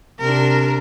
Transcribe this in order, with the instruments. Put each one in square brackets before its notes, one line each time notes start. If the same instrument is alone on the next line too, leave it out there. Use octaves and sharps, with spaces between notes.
[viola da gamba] C3 D4 [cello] A#4